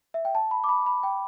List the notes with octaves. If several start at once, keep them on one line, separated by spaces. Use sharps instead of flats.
E5
G5
A5
B5
D6
B5
B5
G5